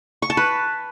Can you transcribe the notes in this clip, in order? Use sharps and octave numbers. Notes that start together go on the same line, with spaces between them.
C#6
A5
B4